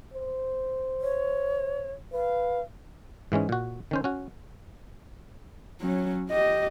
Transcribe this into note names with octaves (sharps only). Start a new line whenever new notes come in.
C5
C#5
B4 F5
G#2 E3 G#3 C#4
A#2 F#4
D#3 C#4 C5
C#4 F#4
F#3 C#4
G4 D#5